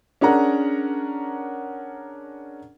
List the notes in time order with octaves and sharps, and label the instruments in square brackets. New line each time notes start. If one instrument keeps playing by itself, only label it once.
[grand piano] C#4 D4 G#4 A#4 F#5 A#5